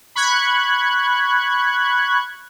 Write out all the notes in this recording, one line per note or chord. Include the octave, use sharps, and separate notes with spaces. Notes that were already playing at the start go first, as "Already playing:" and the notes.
B5 C#6 F#6 G#6